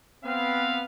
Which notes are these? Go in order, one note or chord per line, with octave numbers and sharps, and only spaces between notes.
B3 C4 B4 F5